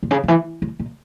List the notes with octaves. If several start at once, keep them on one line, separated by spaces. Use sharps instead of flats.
A#2
C#3
D3
E3
A2
A#2